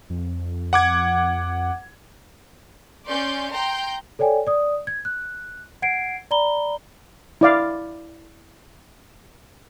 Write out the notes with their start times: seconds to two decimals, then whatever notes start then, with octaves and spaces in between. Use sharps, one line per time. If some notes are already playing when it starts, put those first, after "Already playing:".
0.10 F2
0.73 F#5 D6 G#6
3.08 C#4 D5 C6 G6
3.52 G5 A#5 C6 G6
4.19 A4 C#5 D5 G5 G#5
4.47 D5 D#6
4.87 G#6
5.05 F#6
5.82 F#5 G#6 C7 D7
6.31 D5 A#5 B5 G7
7.41 E4 D5 F5